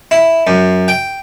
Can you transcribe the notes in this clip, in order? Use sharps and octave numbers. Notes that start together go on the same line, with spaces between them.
E4
F#2
G5